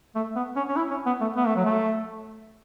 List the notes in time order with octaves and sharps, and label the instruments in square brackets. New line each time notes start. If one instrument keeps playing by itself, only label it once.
[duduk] A3
B3
C#4
C#4
E4
C#4
B3
A3
B3
A3
F#3
A3